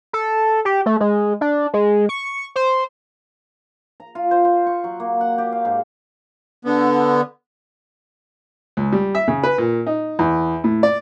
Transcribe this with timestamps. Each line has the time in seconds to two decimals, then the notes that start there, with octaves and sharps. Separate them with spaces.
0.13 A4
0.65 G4
0.86 A3
1.00 G#3
1.41 D4
1.73 G#3
2.09 C#6
2.56 C5
4.00 A#5
4.15 F4
4.31 C5
4.45 C5
4.66 C#6
4.84 F#3
5.00 A#3
5.21 F#5
5.38 G4
5.52 F5
5.65 G#2
6.65 D3 B3
8.77 C#2
8.92 G3
9.15 E5
9.28 C#3
9.44 B4
9.58 A#2
9.87 D#4
10.19 E2
10.64 A2
10.83 D5